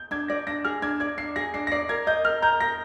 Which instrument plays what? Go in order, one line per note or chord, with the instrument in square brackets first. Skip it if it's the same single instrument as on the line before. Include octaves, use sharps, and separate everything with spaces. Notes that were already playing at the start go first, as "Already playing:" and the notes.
Already playing: [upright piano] G6
[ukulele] D4 [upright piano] G#6
[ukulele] D5 [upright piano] A#6
[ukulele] D4 [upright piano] A#6
[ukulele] G#4 [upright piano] F6
[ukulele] D4 [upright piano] G#6
[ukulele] D5 [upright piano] G#6
[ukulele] D4 [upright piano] C7
[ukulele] G#4 [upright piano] A#6
[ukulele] D4 [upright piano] C7
[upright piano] A#6
[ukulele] D5 [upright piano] C7
[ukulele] A#4 [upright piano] G#6
[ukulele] D#5 [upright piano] G6
[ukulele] A#4 [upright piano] F6
[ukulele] A#5 [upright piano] G6
[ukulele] A#4 [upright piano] A#6